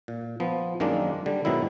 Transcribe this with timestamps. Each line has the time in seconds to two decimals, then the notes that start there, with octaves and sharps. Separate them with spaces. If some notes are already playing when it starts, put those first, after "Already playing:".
0.08 A#2
0.40 F3 B3
0.80 F#2 D#3 G#3 A#3 D4
1.26 D3 G3
1.45 G#2 B2 D#3 F#3 E4